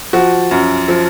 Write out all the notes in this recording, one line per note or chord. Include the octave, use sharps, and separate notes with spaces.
F3 F#4
F#2
F3